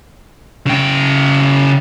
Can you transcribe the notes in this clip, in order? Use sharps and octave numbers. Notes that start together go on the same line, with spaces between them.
C#3 G5